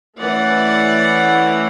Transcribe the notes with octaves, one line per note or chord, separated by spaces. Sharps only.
E3 A3 C#4 E4 D5 F#5